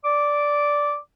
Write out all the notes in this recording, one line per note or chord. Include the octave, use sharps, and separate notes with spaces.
D5 D6